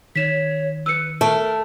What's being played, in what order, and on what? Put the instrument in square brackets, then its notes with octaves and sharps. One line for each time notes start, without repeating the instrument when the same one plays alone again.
[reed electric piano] D#3 [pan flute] C#5 [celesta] B6 E7
[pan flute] B4 [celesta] E6 C#7
[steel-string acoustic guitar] A3 [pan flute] A#4 [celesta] A5